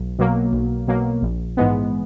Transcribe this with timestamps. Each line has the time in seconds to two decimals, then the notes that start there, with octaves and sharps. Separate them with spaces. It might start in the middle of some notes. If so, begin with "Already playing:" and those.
Already playing: B1
0.19 B2 F#3 A#3
0.53 B1
0.88 B2 F#3 A#3
1.22 A#1
1.57 G#2 E3 G#3 B3